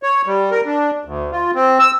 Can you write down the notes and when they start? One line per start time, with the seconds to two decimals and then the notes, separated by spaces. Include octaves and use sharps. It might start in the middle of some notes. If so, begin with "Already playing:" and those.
0.03 C#5
0.26 G3
0.51 A#4
0.66 D4
1.05 D2
1.32 F4
1.55 C4
1.79 E6